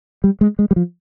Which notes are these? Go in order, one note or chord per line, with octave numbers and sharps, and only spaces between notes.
G3
G#3
G#3
G3
F3